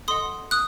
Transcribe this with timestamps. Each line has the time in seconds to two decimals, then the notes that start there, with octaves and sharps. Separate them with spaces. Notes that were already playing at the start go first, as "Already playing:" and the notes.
0.08 A4 D#5 F#5 C6 D#6
0.51 D#6 F#6